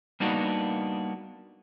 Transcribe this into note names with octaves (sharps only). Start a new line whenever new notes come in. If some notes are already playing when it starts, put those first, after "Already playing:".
G3 A#3 B3 D4 D#4 F#4